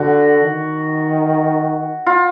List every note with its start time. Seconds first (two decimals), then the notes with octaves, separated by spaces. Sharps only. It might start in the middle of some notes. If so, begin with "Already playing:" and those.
Already playing: D3 F#4
0.44 D#3
2.06 F4